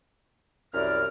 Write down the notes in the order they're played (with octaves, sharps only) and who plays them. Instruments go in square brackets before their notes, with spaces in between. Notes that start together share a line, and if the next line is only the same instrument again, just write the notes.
[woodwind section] C2 F#2 F6 [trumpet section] E4 D5